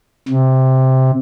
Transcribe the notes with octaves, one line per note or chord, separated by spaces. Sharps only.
C3